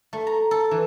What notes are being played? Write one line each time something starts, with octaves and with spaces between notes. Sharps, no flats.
A3
A#5
A4
E3